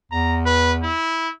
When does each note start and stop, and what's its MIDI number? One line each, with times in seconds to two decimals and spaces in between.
0.12 0.92 40
0.12 0.38 82
0.46 0.73 71
0.82 1.29 64